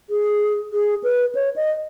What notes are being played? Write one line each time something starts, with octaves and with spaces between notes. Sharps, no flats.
G#4
G#4
B4
C#5
D#5